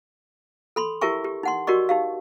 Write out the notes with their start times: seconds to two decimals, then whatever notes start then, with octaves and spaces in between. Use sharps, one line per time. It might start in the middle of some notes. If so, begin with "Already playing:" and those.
0.76 A4 B5 C6
1.01 E4 G4 A#4 E5 G#5 C#6
1.24 G4
1.43 D#4 F#5 C6
1.67 F#4 G4 A#4 D5 D#5 C#6
1.89 D#4 G4 F5